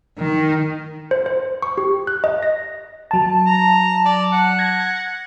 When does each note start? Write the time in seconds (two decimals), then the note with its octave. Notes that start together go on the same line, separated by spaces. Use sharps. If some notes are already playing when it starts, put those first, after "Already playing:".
0.18 D#3
1.11 C5
1.26 C5
1.62 C#6
1.78 G4
2.07 F#6
2.24 D#5
2.43 A#6
3.11 F#3 A5
3.46 A#5
4.05 D5
4.33 F#5
4.59 G#6 A#6